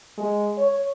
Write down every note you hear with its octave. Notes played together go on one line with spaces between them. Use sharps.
G#3
C#5